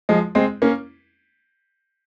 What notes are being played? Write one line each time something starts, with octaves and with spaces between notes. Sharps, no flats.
F3 G#3
G#3 C4
A#3 C#4